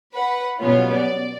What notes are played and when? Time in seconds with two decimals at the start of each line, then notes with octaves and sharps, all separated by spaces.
0.13 B4 F#5
0.59 B2 F#3 G3 B3 C#4 F4
0.94 D5